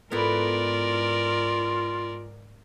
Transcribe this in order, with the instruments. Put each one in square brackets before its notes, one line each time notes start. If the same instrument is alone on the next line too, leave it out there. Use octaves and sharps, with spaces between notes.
[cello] G#2 [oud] B3 E4 A4 [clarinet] F4 [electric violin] A#4 D5